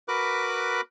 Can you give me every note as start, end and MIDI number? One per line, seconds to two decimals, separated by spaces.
0.08 0.81 66
0.08 0.81 70
0.08 0.81 71
0.08 0.81 83
0.08 0.81 86
0.08 0.81 90